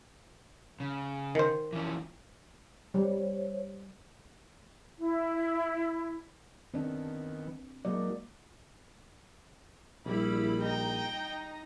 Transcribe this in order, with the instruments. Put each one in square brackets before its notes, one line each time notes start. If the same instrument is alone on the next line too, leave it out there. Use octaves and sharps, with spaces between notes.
[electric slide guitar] C#3
[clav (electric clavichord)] D#3 C5
[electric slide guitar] E3 F3 C#4
[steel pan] G3 [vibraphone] C5 C#5
[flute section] E4
[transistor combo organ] D#3 B3 [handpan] C4 D4
[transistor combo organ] F#3 D#4 [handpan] G#3 A#3 D5
[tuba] A#1 [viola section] G3 E4 B5
[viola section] D#4 A#5 [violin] G5